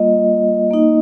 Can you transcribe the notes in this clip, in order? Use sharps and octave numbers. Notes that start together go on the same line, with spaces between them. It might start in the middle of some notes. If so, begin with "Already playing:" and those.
Already playing: G3 A#3 F4 D#5
A#3 D#4